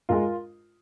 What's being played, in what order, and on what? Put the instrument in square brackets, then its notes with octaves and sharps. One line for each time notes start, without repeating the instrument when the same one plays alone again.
[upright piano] G#2 G#3 F4 A#4